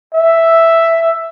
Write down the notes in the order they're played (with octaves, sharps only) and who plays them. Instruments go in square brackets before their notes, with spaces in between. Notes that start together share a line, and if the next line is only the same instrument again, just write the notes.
[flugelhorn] E5